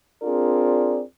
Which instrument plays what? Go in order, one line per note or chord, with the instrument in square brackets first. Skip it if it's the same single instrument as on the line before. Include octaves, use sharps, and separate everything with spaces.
[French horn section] C4 D4 F4 G#4 A#4 D5